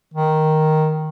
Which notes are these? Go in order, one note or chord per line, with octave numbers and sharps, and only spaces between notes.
D#3